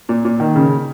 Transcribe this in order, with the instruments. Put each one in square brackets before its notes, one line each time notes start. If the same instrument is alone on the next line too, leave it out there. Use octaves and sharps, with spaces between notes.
[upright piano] A#2
A#2
D#3
C#3